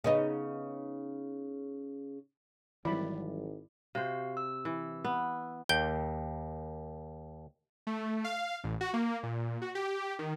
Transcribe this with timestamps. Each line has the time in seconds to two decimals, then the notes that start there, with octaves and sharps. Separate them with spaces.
0.04 C#3 B3 D#4
2.85 G#1 E3 F#3 G3 E4 D5 E5 B5
3.95 C3 F#4 C5 F5
4.37 E6
4.65 E3
5.05 B3
5.69 D#2 G5 G6 G7
7.87 A3
8.24 F5
8.64 A1
8.81 F#4
8.94 A#3
9.23 A#2
9.62 F#4
9.75 G4
10.19 D#3